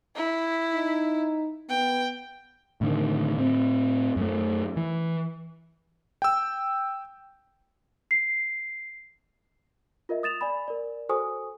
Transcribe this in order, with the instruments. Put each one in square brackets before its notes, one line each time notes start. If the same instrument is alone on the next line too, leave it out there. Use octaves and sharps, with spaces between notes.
[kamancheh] E4
[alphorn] D#4
[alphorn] B3 [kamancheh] G5
[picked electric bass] A2 D3 D#3
A2 C4
F#2 A3
E3
[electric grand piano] G5 E6
[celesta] C7
F4 A#4 D#5 E5
D#6 A6 E7 F7
D5 G#5 B5
A#4 D5
F#4 A4 C5 G#5 C#6 D#6